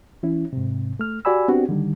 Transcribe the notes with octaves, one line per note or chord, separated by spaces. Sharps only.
E3 C#4 E4
G#2 C3
A3 F6
F#4 G4 D5 G#5 B5 E6
B3 C4 D4 F#4 G4
D3 D#3 G3